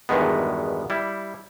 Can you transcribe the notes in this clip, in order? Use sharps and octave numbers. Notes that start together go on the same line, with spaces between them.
E2 G2 B2 D#3 G#3 B3
G3 E4